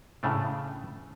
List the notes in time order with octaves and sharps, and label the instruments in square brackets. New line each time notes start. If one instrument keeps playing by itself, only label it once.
[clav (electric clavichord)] A2 C#3 A3 D4